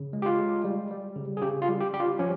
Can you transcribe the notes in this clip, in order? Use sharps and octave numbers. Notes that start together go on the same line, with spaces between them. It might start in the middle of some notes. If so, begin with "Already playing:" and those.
Already playing: C#3
G#3
G4
F4
G#3
G3
G3
C#3
G#4
C#3 G4
F4
G3
G4
G3 G4
F4
F3 C#4